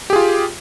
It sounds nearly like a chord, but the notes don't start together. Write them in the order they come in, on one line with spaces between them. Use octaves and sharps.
G4 G#4 F4